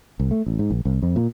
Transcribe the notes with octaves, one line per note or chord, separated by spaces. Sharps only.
C2
A3
A1
G#2
A#1
C2
F2
A#2